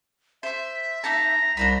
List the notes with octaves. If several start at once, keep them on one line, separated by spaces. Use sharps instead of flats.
C5 E5 C6
A#3 D#4 A5 A#5
C2 D4 C5 B5